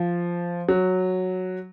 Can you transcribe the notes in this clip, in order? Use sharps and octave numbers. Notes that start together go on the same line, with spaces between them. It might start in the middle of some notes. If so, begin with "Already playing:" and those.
Already playing: F3
F#3